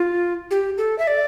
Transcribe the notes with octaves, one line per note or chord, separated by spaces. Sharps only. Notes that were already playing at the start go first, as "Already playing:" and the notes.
Already playing: F4
G4
A4
E5
D5